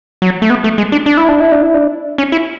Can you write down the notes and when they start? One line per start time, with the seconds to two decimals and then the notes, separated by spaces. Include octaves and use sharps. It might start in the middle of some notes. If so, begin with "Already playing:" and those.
0.22 F#3
0.42 A3
0.50 B3
0.64 A3
0.78 G#3
0.92 D4
1.06 D4
1.17 E4
1.29 D4
1.40 E4
1.52 D4
1.62 E4
1.74 D4
2.18 C#4
2.32 E4